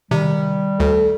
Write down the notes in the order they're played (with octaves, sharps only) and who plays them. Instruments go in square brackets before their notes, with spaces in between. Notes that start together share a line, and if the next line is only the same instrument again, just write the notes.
[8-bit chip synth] C3 [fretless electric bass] D#3 [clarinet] G3
[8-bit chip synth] D2 [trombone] A4